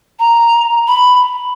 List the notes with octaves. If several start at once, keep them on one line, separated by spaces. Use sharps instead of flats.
A#5
B5